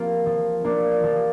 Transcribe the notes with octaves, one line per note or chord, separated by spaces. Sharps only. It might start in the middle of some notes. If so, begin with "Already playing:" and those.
Already playing: F3 A#3 F4
F3
A#3 D4 F4
F3